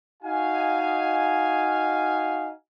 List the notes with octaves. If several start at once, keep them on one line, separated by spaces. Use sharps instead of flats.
D#4 F#4 F5 G#5